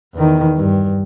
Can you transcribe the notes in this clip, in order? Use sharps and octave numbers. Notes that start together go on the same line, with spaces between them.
E2 D#3
G2